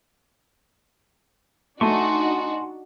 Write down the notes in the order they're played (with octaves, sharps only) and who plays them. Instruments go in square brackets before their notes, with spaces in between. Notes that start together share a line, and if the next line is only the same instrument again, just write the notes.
[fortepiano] A3 [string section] D4 D#4 F#4 [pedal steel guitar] G#5 C6 C#6